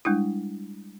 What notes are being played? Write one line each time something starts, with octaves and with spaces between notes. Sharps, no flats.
G3 G#3 D4 E4